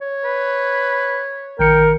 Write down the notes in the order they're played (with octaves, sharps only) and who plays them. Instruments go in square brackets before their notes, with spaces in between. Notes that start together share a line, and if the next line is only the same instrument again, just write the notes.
[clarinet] C#5
[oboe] B4
[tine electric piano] A#1 D#3 C#7 [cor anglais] A#4 [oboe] G5